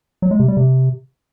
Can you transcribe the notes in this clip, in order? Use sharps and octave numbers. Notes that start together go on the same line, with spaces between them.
F#3
G#3
C3
G3
C3